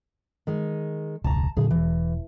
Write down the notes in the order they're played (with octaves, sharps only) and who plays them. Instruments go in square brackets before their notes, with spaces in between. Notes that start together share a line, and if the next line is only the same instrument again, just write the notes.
[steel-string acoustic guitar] D#3 G#3
[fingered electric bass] E1 C#2 [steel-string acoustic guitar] A5 A#5
[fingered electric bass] A#2 D3 F#3 [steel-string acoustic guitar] G#4
[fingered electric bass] E1 [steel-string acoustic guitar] E3